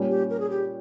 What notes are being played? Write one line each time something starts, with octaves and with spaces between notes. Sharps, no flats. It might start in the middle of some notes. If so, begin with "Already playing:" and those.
Already playing: A#2 G3 C#4
G4
A#4
G#4
G4